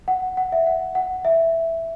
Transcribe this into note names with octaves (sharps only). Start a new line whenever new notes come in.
F#5
F#5
E5
F#5
F#5
E5